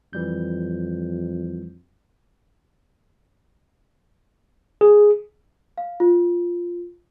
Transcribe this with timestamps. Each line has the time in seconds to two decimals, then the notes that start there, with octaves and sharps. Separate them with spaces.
0.13 F2 E3 G3 G6
4.81 G#4
5.78 F5
6.00 F4